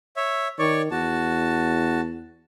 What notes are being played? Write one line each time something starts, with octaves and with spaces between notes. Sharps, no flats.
C#5 E5
D#3 C#5 D5 C#6
E2 F#4 A5